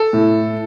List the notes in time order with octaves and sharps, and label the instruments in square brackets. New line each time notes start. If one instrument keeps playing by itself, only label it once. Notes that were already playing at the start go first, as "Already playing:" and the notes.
Already playing: [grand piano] A4
[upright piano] A2